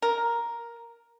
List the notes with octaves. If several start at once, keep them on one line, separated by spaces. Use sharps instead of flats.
A#4